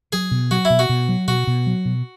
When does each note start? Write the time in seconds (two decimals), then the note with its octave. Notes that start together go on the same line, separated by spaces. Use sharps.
0.13 F#3 G#4
0.31 B2
0.51 F#3 F#4
0.65 E4
0.70 B2
0.79 F#4
0.89 B2
1.09 F#3
1.28 B2 F#4
1.47 B2
1.67 F#3
1.85 B2